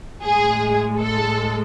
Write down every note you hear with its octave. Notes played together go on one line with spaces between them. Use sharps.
A2 G#3 G#4
A4